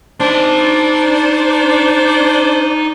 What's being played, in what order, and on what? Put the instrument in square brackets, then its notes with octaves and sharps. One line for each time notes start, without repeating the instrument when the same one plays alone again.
[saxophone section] D4 C5 [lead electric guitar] D#4 A5